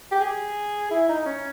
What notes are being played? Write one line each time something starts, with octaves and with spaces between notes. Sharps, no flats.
G4
G#4
E4
D#4
C#4